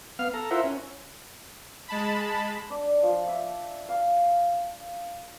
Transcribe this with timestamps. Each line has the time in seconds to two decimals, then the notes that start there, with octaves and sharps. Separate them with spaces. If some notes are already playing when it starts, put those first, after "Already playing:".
0.19 B3 F5 F6
0.34 A4 A#5
0.51 E4 F4 A#4 C5 E5 F#5
0.64 C#4
1.88 G#3 A5 B5
2.70 D4
3.03 F3
3.27 E5
3.89 F5